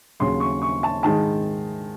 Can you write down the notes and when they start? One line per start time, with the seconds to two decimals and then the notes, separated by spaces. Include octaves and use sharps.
0.20 D#2 C#3 F#3 C6
0.40 C#6
0.62 C#6
0.83 A5
1.03 G#2 D#3 G#3 A5